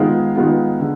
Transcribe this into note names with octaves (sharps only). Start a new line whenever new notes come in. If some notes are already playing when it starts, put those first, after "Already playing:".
Already playing: D#3 G#3 B3 F4
D#3 G#3 B3 F4
D3